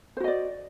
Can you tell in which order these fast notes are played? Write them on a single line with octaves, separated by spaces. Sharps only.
C5 F#4 D#5 D5